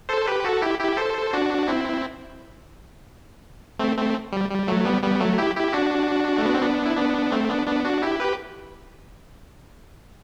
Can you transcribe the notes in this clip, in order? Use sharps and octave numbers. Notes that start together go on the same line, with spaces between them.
A4 C5
G4 B4
F#4 A4
E4 G4
E4 G4
A4 C5
D4 F#4
C4 E4
A3 C4
A3 C4
G3
G3
F#3 A3
G3 B3
G3 B3
F#3 A3
E4 G4
E4 G4
D4 F#4
A3
B3
C4
B3 D4
E4
B3 D4
A3 C4
B3 D4
B3 D4
D4 F#4
E4 G4
G4 B4